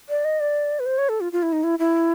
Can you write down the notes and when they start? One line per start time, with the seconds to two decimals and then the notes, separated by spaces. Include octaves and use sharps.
0.09 D5
0.25 D#5
0.40 D5
0.80 B4
0.86 C5
0.98 C#5
1.09 A4
1.21 F4
1.32 F4
1.43 E4
1.52 D#4
1.63 E4
1.79 E4